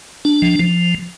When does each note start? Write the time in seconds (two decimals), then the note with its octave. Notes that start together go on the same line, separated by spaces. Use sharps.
0.25 D4
0.42 F3
0.59 F3